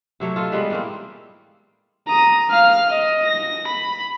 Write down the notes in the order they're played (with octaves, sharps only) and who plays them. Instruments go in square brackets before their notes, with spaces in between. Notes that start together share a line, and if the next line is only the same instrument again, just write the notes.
[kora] C3 F#3 A3 C#5
F4 A4 D#5
E3 G3 G#3 B3
A2 A#3 C4
[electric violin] A#5 D#6
F5 F6
D#5
A#6
B5